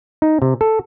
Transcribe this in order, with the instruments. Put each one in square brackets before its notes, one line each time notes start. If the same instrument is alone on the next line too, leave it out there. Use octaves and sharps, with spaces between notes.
[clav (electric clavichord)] D#4
C3
A4